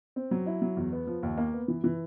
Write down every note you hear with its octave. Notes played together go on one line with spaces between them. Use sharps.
C4
F#3
E4
F#3
E2
B3
F3
D#2
A#3
B3
E3
E3